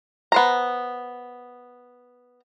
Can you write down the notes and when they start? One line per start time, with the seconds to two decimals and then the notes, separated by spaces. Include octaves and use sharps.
0.32 B3 C5 A#5